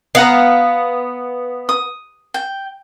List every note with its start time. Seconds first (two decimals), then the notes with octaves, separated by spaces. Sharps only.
0.15 B3 F5 F#5 A#5
1.69 D#6
2.34 G5